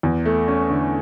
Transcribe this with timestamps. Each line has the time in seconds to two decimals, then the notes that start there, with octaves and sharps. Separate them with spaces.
0.03 E2
0.25 A3
0.48 C#4
0.70 D3